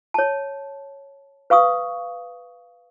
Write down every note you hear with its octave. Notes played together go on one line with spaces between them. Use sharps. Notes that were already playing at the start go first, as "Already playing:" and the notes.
C#5 A5
B4 F5 C#6 D#6